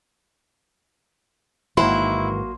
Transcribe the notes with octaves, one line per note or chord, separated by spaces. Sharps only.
A1 G#2 D#3 E3 F#3 A#3 E4 C6